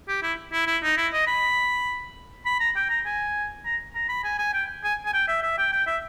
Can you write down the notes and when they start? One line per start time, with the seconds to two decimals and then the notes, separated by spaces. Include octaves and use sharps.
0.08 G4
0.23 E4
0.52 E4
0.67 E4
0.83 D#4
0.97 E4
1.13 D#5
1.27 B5
2.46 B5
2.60 A#5
2.76 G5
2.90 A#5
3.06 G#5
3.65 A#5
3.95 A#5
4.09 B5
4.24 G#5
4.39 G#5
4.54 G5
4.84 G#5
5.06 G#5
5.14 G5
5.28 E5
5.43 E5
5.58 G5
5.72 G5
5.87 E5